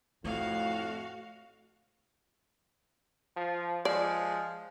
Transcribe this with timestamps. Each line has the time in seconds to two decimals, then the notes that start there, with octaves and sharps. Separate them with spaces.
0.24 F2 A2 A3 F#4 F5
3.36 F3
3.85 F3 G#3 D5